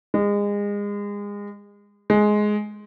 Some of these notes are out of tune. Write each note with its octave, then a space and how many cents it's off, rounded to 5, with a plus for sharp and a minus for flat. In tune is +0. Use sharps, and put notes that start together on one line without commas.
G#3 -30
G#3 +10